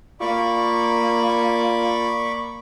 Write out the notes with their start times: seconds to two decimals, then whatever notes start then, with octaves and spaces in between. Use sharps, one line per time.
0.21 A#3 F4 D5 B5 C#6 D6